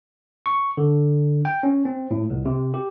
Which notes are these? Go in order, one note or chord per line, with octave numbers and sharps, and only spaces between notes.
C#6
D3
G5
C#4
C4
A2
C2
C3
G4